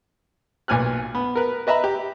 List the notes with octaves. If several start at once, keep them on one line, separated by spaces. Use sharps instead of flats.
B1 A#2 G#5 F6 F#6
B3
A#4 B4
B4 D#5 E5 A#5 B5
G4